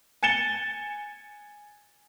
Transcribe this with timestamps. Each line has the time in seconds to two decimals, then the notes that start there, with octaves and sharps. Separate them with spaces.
0.23 G#5 A6 C#7 E7 G7